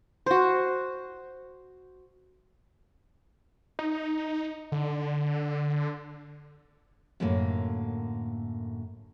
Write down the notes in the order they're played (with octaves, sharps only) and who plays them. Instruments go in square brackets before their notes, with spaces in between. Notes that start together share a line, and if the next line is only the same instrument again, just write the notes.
[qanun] F#4 C5
[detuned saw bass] D#4
D3
[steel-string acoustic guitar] F#2 A2 D3 A3 A#3